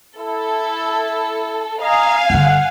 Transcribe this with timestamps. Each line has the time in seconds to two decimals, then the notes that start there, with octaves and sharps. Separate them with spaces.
0.17 E4 A4
1.81 D#5 F5 G#5 A#5
2.30 G1 D3 F#5